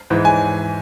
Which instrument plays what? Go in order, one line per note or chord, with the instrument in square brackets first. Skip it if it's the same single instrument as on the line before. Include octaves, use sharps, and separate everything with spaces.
[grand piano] G#2 E3
G#5